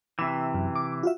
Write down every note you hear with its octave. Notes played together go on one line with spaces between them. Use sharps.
C3 E3 E6
F#2
D6
F4 F#4 E5